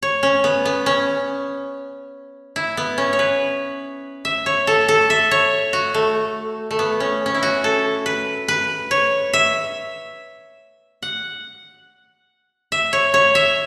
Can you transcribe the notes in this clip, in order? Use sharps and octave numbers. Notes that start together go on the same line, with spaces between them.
C#5
C#4
B3
B3
C#4
E4
B3
C#4
C#5
B4
E5
C#5
A4
A4
E5
C#5
F#4
A3
A3
B3
C#4
C#4
E4
F#4
A4
B4
B4
C#5
E5
F#5
E5
C#5
C#5
E5